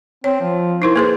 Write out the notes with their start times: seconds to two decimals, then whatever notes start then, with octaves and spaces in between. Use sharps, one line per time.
0.24 C4 C#5
0.41 F3
0.82 D#4 E4 A#4 C5
0.96 A#3 G#4 B4 C5